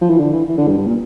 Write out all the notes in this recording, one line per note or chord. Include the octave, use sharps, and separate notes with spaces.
F3
E3
D3
E3
E3
D3
G2
G2
A#2